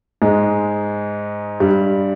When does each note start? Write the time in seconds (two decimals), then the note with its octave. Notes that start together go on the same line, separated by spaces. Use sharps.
0.22 G#2 G#3
1.60 G2 G3